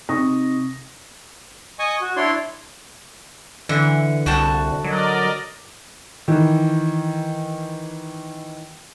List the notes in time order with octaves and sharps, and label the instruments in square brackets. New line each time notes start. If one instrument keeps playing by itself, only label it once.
[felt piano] C3 D#4 C#6 D#6 A#6
[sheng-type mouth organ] D#5 G#5 C#6 D#6
F#4
D4 E4 C#5 D5 C6
[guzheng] D3 [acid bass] E3
[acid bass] C2 [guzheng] F#4 G5 A5
[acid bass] F#3 [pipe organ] A#4 D5 D#5
[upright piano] D#3 E3